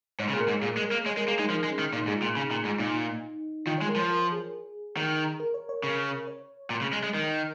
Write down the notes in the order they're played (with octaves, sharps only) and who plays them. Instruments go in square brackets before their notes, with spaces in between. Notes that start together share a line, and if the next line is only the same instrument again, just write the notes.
[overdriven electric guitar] G#2 [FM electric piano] C#5
[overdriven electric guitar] C#3
[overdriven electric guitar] A#2 [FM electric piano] G#4
[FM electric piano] A#4
[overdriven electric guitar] G#2
[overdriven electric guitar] A#2 [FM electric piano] G#4
[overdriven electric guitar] G#3
[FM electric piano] A#4
[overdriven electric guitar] A#3
[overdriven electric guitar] G#3 [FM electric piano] C#5
[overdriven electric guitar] G#3 [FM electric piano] A#4
[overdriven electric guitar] A#3 [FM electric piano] G#4
[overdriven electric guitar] G#3 [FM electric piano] D#4
[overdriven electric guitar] F3 [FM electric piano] D#4
[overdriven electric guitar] G#3
[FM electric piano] C#4
[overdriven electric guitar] D#3
[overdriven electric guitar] A#2 [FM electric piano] D#4
[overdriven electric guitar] G#2 [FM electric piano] G#4
[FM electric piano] F4
[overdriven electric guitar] A#2
C#3
A#2
G#2
[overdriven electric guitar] A#2 [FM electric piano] D#4
[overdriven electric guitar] D#3 [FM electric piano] F4
[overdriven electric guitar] G#3 [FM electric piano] C#5
[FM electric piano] A#4
[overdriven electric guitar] F3 [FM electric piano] C#5
[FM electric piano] A#4
G#4
[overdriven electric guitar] D#3
[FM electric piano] A#4
C#5
C#5
[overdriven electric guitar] C#3 [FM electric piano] A#4
[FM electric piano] C#5
[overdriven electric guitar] A#2
C#3
G#3
G#3
[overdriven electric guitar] D#3 [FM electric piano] A#4